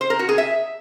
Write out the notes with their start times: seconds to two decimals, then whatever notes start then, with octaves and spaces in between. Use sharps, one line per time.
0.01 C5
0.10 A#4
0.19 F#4
0.29 G#4
0.38 E5